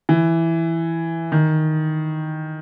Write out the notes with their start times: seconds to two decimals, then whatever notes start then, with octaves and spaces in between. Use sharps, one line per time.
0.09 E3
1.32 D#3